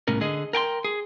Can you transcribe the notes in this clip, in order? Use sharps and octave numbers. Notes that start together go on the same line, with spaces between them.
C2 A2 C#4 A#4
D3 G#4 D#5
A#4 G5 G#5 C6
G#4